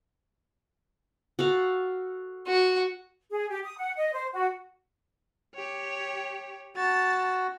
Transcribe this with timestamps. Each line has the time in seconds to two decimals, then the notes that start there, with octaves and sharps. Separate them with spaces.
1.39 F#4 A4 F5
2.48 F#4
3.30 G#4
3.49 G4
3.64 D#6
3.77 F#5
3.97 D#5
4.13 C5
4.33 F#4
5.55 G4 C#5
6.76 F#4 A5 A6